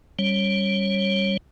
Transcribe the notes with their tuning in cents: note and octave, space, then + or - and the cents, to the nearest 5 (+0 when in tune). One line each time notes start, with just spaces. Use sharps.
G3 +0 C#4 +0 C#5 -20